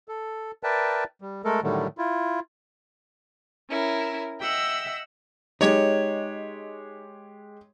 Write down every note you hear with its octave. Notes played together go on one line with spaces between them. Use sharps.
A4
A#4 B4 D5 E5 G5 A5
G3
G#3 A3 A4 A#4
A2 D3 D#3 F#3 G3 A3
E4 F4
C#4 E4 A#4
D#5 E5 F#5 G5 E6
G#3 D#4 G4 C#5